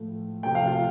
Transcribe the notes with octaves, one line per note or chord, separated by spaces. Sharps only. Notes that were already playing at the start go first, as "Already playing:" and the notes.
Already playing: A2 F3 A3
C3 F3 A3 G5
F5
F4